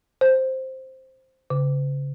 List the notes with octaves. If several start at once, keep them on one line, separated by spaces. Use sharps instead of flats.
C5
C#3